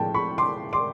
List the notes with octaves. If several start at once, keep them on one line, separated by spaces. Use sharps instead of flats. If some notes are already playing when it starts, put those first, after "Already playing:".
Already playing: A2 F3 G#3 G5 A5
B5 C#6
C6 D6
C6 D6